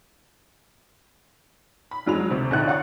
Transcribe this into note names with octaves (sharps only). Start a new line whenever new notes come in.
B5
F2 F#3 G#3 F7
D2 C3
A#1 D3 D#4 E4 F#5 F#6
C#5 F5 F#5 C#6